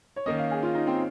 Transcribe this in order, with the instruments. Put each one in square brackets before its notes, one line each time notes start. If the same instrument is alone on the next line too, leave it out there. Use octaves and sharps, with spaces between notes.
[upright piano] C#5
[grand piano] D#3 A#3 C#4 [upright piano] D#5
[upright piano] F5
G#4
F4
D#4
C4